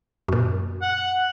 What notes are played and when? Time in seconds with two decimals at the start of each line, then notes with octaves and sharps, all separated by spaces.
0.28 F#2 A#2
0.82 F#5